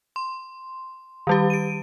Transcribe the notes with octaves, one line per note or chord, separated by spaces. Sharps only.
C6
D#3 G3 G4
D7 D#7